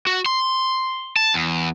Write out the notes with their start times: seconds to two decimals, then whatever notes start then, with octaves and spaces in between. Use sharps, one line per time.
0.07 F#4
0.26 C6
1.16 A5
1.34 E2